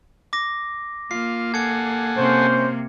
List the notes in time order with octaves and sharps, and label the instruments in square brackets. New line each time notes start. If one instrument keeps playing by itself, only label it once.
[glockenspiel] D6 A#6
[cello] A#3 [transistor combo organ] F4 [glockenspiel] C7
[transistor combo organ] A4 F#5 G#5 [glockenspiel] G#6 C#7
[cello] C3 A#3 [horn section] C#4 C5